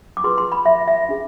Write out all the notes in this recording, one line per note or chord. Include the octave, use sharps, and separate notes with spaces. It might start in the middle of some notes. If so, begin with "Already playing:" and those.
D6
F4 G#4 B4 C6
C6
B5
E5
E5
D4 G#4